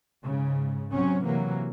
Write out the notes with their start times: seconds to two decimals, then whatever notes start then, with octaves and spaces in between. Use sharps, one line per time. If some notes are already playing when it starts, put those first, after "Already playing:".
0.24 G#2 C#3
0.93 C3 F#3 C4 C#4
1.24 C3 E3 F#3 A#3